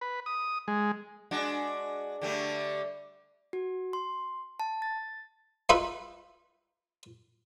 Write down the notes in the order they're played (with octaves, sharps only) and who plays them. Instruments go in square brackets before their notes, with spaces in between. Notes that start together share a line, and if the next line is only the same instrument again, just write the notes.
[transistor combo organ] B4
D#6
G#3
[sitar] G#3 D4 F#4
D3 G3 A3
[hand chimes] F#4
C6
A5
A6
[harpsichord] D#4 F4 B4 E5 B5